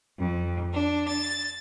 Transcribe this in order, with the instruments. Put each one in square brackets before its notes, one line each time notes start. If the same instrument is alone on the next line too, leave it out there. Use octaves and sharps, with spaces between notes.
[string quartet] F2
D4
A6